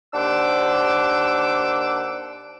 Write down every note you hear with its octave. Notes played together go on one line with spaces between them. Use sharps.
D#2 D4 C5 F#5 D6 E6